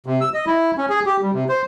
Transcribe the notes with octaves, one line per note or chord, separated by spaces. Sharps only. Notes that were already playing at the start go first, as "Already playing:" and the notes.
C3
E6
D#5
E4
C#4
G#4
G4
G3
C3
C5